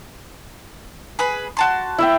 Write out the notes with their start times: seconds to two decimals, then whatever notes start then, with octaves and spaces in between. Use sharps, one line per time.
1.19 G#4 B4 B5
1.57 F#4 A5 C6
1.98 E4 E5 G5